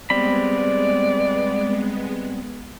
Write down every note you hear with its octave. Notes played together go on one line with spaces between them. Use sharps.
G3 G#3 B3 C4 D5 B5